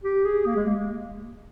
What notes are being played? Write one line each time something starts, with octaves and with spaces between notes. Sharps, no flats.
G4
G#4
A#3
G#3
A#3